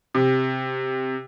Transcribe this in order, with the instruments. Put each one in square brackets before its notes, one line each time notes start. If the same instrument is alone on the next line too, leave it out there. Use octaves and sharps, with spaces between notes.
[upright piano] C3